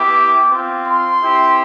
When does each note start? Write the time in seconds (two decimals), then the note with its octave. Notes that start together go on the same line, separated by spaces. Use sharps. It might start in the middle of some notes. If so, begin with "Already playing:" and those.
Already playing: B3 E4 G4 D6
0.49 C4 F4
0.86 C6
1.23 C4 E4 G4